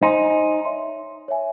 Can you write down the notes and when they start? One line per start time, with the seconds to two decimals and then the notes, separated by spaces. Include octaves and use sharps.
0.02 D#4 C5 D#5 G#5 C6
0.65 C#5 E5 C6
1.28 C#5 E5 G#5